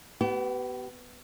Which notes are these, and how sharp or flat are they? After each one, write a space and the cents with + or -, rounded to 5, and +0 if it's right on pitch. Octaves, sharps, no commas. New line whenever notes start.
B3 +10 G4 -40